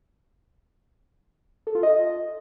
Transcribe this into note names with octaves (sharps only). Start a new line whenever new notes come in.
A4
F4
D#5